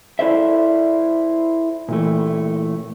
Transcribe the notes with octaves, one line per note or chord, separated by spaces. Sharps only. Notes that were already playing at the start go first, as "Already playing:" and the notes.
E4 A4 C5 D5 E5
A#2 E3 A3